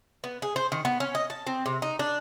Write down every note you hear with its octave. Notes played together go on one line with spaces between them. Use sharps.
B3
G#4
C5
D#3
B3
C#4
D#5
A5
C4
C3
D#4
D4